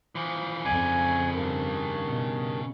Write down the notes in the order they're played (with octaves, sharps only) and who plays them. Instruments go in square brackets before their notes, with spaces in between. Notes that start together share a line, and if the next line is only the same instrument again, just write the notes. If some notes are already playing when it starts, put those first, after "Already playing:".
[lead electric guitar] E3 F3
[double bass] F2 [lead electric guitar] C#3 D5 [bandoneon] G#5
[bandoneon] G2 D#3
[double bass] B2